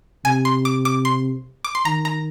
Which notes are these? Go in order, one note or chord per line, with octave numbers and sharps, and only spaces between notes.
C3 G#5
C6
D6
D6
C6
D6
C6
D#3 A#5
A#5